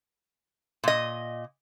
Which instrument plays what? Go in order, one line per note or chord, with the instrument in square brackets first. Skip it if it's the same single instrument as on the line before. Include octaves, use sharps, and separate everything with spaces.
[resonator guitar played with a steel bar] A#2 D#5